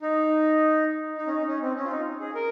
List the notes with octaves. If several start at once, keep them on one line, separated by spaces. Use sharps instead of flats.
D#4
D#4
C#4
D#4
C#4
C4
C#4
F4
D#4
G#4
A#4